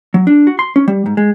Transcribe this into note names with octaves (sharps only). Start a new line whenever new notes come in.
F#3
D4
F#4
C6
C#4
G3
G#2
G#3